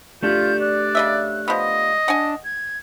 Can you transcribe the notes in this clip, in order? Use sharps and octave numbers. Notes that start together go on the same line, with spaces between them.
A3 D4 F4 G4 G6
D5 F#6
C#3 D#5 E5
F3 B3 D#5
D4 F#5 G#5
G#6